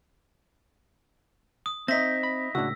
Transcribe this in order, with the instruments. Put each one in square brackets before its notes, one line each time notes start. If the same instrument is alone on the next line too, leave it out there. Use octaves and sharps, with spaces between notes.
[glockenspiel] D#6
[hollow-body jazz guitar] C4 [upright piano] D#4 E5 [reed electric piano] G6 [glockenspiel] A#6 B6
[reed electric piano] B5
[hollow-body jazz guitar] C#2 A2 [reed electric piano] D4 E4 F#4 [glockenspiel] E6